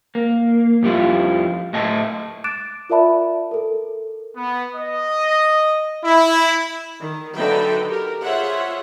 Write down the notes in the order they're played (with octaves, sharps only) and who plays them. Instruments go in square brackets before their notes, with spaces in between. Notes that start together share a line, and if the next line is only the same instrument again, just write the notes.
[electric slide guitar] A#3
F2 G3 E4 F4
A2 D#5 E5 A5
[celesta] D6 F#6 A6 D7 E7
F4 A#4 D5 E5 A5 B5
A4 A#4
[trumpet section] B3
D#5
E4
[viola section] D#3
D3 F#3 D#4 B4 E5 G5
G4 A#4
F4 G#4 C5 C#5 E5 F#5